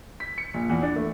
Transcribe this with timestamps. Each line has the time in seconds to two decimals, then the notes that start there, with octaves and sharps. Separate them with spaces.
0.20 B6
0.38 C#7
0.54 A#1
0.69 E2
0.82 D4
0.96 A3